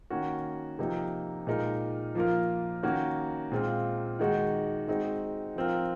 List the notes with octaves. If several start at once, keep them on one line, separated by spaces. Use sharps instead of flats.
D#3 A#3 C#4 F#4
C3 F3 A#3 D#4
A#2 G#3 D#4 A#4
F3 A#3 F4 A#4
D#3 A#3 C#4 F#4
A#2 G#3 C4 F4
D#3 G#3 D#4 F#4
G#3 C4 D#4 F#4
F3 C4 F4 A#4